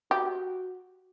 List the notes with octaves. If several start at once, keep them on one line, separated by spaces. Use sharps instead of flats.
F#4 G4